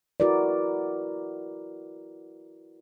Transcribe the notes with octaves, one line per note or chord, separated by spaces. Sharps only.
E4 F#4 A#4 B4 D5